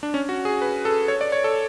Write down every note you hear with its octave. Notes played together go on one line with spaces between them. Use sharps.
D4
C#4
F#4
G#4
B4
A4
C#5
D5
C#5
A4